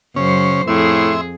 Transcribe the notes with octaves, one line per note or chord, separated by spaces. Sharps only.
F#2 C#3 C#4 C5
F2 A2 G#4 E5 C6